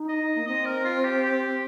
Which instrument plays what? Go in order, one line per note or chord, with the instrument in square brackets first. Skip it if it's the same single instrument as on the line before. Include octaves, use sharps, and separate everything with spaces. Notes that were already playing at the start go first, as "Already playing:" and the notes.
Already playing: [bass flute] D#4
[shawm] D#5
[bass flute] A#3
[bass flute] C4 [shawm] D#5
[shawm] A#4
F4
G4
G4